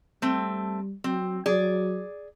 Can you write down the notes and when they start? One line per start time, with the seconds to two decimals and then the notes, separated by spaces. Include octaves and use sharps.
0.22 G3 A3 C4
1.04 F#3 C4
1.46 F#3 G#4 D5